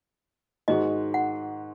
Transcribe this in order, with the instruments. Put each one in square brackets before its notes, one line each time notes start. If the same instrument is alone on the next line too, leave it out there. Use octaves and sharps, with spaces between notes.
[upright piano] G#2 D#3 G#3 F#4 [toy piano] D#5
[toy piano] F#5